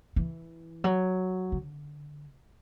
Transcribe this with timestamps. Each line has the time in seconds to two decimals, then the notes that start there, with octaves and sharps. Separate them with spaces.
0.16 E3
0.84 F#3
1.52 D3